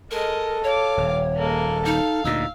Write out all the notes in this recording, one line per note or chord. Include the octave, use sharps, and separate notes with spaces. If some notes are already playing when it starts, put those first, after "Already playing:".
G#3 A4 A#4 D#5
C#5 F5 D6
D#1
G#3 A#3 A4
D#4 F5
D2 A#2 D#4 E6